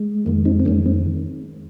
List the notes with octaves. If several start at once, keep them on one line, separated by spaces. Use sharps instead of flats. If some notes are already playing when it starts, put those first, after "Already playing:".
Already playing: G#3
F2 D#3 G#3 A#3
C4 D#4
C4
F2 D#3 G#3 A#3 C#4
G#3 C4